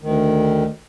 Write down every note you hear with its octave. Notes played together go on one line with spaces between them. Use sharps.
D2 D#3